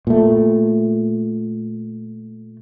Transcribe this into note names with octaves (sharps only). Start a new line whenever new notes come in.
A#2 A3